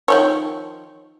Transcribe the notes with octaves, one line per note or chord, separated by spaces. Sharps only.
D#3 F3 C#5